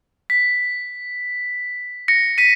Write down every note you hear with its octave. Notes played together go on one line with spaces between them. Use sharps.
B6
A#6 C#7
B6 D#7